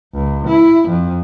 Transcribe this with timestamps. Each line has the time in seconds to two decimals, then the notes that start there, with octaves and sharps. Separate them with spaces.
0.14 C#2
0.48 E4
0.89 F2